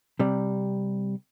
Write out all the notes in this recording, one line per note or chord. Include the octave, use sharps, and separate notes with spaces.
C3 G3